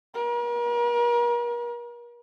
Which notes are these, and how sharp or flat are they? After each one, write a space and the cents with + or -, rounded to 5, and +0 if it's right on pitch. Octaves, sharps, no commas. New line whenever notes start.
A#4 +40